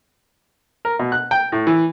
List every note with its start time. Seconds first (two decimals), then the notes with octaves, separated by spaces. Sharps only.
0.85 A#4
0.99 B2
1.12 F#6
1.31 G5
1.52 A2
1.67 E3